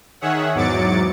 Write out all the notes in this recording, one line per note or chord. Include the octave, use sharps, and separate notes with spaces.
D#3 G#4 C#5 E5 F#5
E2 G#2 F#3 D6 A6 C#7